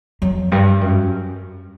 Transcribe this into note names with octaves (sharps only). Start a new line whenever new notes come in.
F2 F#3
G2 G3
F#2